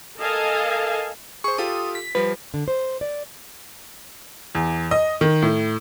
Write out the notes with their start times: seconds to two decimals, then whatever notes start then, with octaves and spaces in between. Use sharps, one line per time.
0.19 A4 A#4 D#5 F5 G#5 A5
1.44 G#4 C5 C#6
1.58 F4 G4 A4 D#6
1.95 B6
2.15 F3 G3 B4
2.54 D3
2.68 C5
3.01 D5
4.55 E2
4.91 D#5
5.21 D#3
5.42 A2